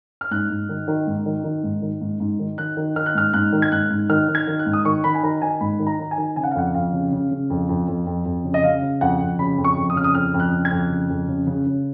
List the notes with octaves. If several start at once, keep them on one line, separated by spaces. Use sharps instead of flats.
F6
G#2 F#6
G#2
D#3
D#3
G#2
D#3
D#3
G#2
D#3
G#2
G#2
D#3
D#3 F#6
D#3
D#3 F6
F#6
G#2 F6
G#2 F#6
D#3
G#6
G#2 F#6
G#2
D#3 F6
D#3
G#6
D#3
F#6
G#2
D#6
D#3 C#6
D#3 B5
G#5
D#3 A#5
D#3 G#5
G#2 B5
D#3
A#5
D#3
G#5
D#3
C#3 G#5
F#5
F5
F2 F#5
F2 F5
C#3
C#3
C#3
F2
F2
F2
F2
F2
C#3
D#5
C#3 F5
C#3
F2 F#5
F2
C#3 B5
F2
C#6
F2
D#6
C#3 F6
D#6
F2 F6
F2
F#6
C#3
G#6
F2
C#3
F2
C#3
C#3
C#3